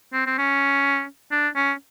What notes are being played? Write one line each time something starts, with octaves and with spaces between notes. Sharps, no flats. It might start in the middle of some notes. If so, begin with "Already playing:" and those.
C4
C4
C#4
D4
C#4